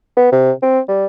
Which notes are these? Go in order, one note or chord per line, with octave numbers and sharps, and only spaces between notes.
B3
C3
C4
G3